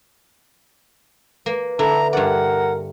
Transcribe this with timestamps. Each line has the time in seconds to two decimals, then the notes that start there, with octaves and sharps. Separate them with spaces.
1.46 A#3 B4
1.79 D3 E4 A4 A#5
2.13 G2 A#4 D5 F#5